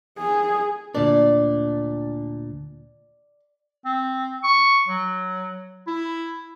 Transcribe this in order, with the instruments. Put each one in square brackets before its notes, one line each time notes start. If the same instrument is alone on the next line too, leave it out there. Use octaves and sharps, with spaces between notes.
[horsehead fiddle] G#4
[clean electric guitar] D2 A#2 D4 [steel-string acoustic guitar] D5
[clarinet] C4
C#6
F#3
E4